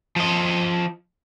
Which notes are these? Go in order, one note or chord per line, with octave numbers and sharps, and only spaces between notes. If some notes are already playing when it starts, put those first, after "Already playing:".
F3 D#5